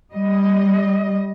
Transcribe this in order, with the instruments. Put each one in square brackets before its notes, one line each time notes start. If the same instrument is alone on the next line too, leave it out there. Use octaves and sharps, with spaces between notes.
[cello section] G3 D#5